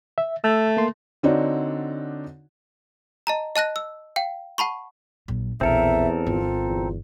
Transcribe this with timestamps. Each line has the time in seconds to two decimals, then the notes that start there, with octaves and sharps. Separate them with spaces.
0.18 E5
0.44 A3 E6
0.77 A#3 C6
1.23 D3 C4 D4 D#4 F#4 C#5
3.27 D#5 A5 A#5
3.56 D#5 A5 F#6 A#6
3.76 E6
4.16 F5 G5
4.58 F#5 A5 B5 C#6
5.28 A#1 F#3
5.61 A#1 E2 B2 C4 A4 A#4 E5
6.27 G1 F4
6.67 E2